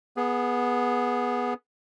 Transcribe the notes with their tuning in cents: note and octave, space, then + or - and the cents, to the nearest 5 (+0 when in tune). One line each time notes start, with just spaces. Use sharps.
B3 -10 G#4 +0